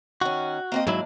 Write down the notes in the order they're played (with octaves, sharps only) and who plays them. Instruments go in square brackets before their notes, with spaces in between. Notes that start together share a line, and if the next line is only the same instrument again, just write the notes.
[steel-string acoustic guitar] D#3 C#4 [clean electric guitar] F#4
[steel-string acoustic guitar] A#3 C4 D#5
[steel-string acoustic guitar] D#2 A#3 D4 [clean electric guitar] G#2 F#3 E4